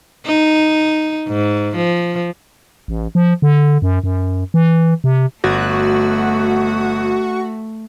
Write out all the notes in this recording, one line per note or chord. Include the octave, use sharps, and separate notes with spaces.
D#4
G#2
F3
A1
F3
D3
F#2
F#2
E3
C3
G1 A3 F#4